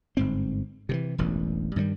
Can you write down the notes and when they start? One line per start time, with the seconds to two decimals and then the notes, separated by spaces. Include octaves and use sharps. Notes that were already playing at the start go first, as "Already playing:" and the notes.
0.17 G1 G#2 C4
0.89 C3 D#3 E3
1.18 E1 A1 G2
1.76 G2 D#3 F#3 G3